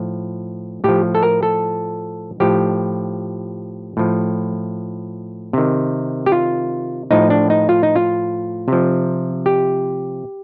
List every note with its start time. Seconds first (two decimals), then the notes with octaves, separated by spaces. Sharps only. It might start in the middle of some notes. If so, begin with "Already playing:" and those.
Already playing: A2 F3
0.84 A2 F3 G4
1.15 A4
1.23 A#4
1.43 A4
2.40 A2 F3 G4
3.97 A2 F3
5.53 C3 D#3
6.26 G4
6.32 F4
7.11 A2 F3 D#4
7.30 D4
7.50 D#4
7.69 F4
7.83 D#4
7.96 F4
8.68 C3 F3
9.46 G4